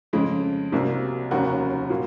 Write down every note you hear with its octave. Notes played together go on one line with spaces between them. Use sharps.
F2 C#3 G#3
C2 C3 F#3 A#3
F1 D#2 C#3 F#3 F#4 A#4
A#2 F#3 A#3